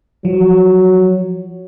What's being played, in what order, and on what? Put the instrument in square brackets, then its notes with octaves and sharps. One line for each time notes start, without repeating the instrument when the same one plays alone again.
[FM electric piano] F3 [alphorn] F#3